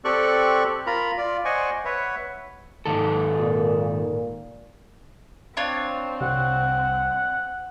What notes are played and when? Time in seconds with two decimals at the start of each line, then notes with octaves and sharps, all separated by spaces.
0.05 C4 G4 A4 D5 C#6 F#6
0.86 F4 A#4 A#5 B5
1.18 F4 D5
1.45 C5 D5 D#5 F#5 G#5 C#6
1.85 B4 C#5 E5 F#5
2.86 G#2 D#3 A4
3.38 A#2
5.57 C4 D4 F4 C#5
6.21 C2 F#5